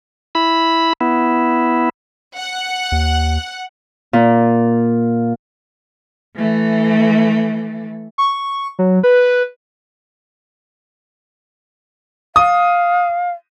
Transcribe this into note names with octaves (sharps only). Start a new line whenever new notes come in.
E4 B5
B3 E4
F#5
D#2
A#2
E3 A3
C#6
F#3
B4
F5 D#6